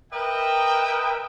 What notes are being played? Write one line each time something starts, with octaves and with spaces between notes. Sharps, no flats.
A#4 B4 D#5 E5 G5